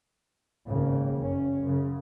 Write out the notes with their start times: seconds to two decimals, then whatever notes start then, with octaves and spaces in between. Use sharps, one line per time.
0.67 G#1 C#3 A#3
1.16 F#1 C#4
1.62 F#2 C#3